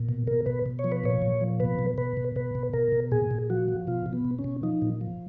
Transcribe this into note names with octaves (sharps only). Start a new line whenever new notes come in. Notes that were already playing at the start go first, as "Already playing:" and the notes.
Already playing: A#2
B2
B2 A#4
B2 B4
B2
C#5
F3
B4
A#2 C#5
A#2
F3
B2 B4
B2
B2 B4
B2
B2 B4
B2
B2 A#4
B2
A#2 G#4
A#2
F3 F#4
F3
B2 F4
B2
B3
B2
C#4
B2
F3 D#4
A#2
F3